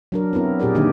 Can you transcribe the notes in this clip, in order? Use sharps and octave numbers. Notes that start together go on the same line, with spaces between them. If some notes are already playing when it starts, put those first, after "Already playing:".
F#3 D4 A#4
B3 C4 E4 A#4
A#2 G4 G#4 A#4 D5
D3 D#3 A#3 D4 D#4 G4